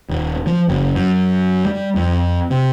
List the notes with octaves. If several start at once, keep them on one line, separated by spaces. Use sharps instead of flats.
D#1
F3
F#1
F#2
G3
F2
C3